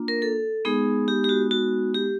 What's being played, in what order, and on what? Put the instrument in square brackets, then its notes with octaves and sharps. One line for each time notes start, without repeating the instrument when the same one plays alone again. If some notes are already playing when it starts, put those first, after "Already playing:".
Already playing: [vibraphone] A#3 D4 F4
A#4
A4
G#3 B3 D#4 G#4
G4
G4
F#4
F#4
G4